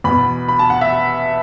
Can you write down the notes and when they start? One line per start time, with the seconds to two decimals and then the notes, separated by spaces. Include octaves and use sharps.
0.04 E2 B2 B3 B5
0.49 B5
0.59 A5
0.70 F#5
0.81 E5